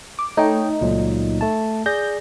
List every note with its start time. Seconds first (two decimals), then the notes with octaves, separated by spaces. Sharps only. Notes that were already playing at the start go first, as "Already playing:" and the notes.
0.19 D6
0.37 A3 D#4 C#5 G5
0.81 C#2 A#2 F#3
1.41 A3 A5
1.86 G#4 D5 G6 A#6